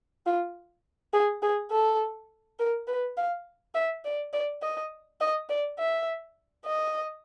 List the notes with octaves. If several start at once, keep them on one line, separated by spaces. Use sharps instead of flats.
F4
G#4
G#4
A4
A#4
B4
F5
E5
D5
D5
D#5
D#5
D5
E5
D#5